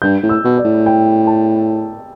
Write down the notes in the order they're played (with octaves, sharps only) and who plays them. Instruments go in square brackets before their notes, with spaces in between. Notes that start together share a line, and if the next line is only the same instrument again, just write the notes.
[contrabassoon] G2 [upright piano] G6
[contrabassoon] A2
[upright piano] E6
[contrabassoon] B2
[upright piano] D5
[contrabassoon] A2
[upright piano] G5
A5